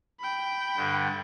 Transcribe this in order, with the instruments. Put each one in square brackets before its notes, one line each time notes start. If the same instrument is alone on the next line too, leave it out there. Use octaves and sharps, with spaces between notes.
[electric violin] G5 B5
[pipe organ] G2 D3